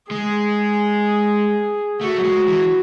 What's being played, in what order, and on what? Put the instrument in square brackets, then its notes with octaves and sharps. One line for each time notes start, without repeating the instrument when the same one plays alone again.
[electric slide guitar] G#3 [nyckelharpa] G#4
[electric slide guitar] A3 [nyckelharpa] F#4
[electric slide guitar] F#3
G#3
E3